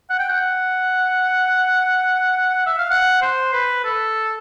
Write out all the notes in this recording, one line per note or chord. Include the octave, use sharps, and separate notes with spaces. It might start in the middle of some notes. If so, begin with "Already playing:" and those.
F#5
G5
F#5
E5
F5
F#5
C5
B4
A4